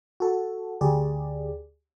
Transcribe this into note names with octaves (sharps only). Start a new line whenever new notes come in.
F#4 A4
D2 G4 G#4 D5